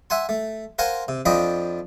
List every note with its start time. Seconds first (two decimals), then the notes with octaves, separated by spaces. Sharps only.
0.10 E5 F#5 G#5 C6
0.29 A3
0.79 A#4 C5 F5 F#5 G#5 C6
1.08 C3
1.26 F2 F3 D4 D#5 G5 B5